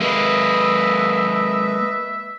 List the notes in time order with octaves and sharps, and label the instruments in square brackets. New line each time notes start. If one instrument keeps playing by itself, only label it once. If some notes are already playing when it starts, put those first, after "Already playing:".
[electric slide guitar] G#3 A#3 [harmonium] B4 D#5 [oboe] E5